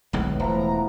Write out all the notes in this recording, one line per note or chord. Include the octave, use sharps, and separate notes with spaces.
D1 B1 A2 G#3 B3
E1 F3 E4 A#5